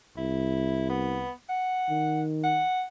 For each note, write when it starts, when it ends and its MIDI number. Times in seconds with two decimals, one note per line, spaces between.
0.17 1.29 36
0.17 0.87 64
0.90 1.31 59
1.49 2.21 78
1.90 2.64 51
2.44 2.84 78